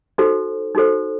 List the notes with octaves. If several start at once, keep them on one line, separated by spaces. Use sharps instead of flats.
D#4 F#4 A4 C5
D#4 F#4 A4 C5